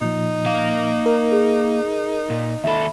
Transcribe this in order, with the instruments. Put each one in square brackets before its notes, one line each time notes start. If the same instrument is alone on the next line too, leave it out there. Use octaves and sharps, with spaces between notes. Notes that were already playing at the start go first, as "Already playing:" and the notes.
[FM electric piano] A#2 F3 [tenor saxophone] D#4
[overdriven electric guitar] A#3 F5
[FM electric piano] A#4
[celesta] G#4
[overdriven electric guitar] A#2
[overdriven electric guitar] D#2 A4 [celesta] E5 B5